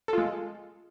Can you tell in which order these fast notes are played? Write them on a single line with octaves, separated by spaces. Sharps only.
A4 F4 G#3